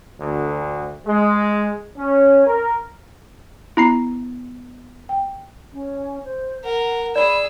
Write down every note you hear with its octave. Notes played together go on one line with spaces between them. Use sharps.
D2
G#3
C#4
A#4
B3 E4 A#5 C7
G5
C#4
C5
A#4 F#5
G#4 D5 B5 E6